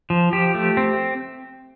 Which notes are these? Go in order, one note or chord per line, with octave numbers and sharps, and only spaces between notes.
F3
F3 G4
A3
C4